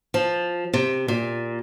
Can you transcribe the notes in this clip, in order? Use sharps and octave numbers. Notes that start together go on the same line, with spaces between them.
F3
C3
A#2